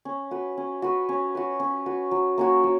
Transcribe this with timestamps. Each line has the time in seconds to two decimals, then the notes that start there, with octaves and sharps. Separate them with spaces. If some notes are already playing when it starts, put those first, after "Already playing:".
0.05 C#4
0.31 F#4 B4
0.57 C#4
0.82 F#4 B4
1.09 C#4
1.35 F#4 B4
1.60 C#4
1.86 F#4 B4
2.11 F#3
2.38 A#3 C#4 F#4
2.64 F#3